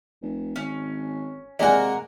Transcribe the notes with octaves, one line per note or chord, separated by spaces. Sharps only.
F1
G#1 C#4
C3 G#3 A#3 F#4 A#4 D5 G#5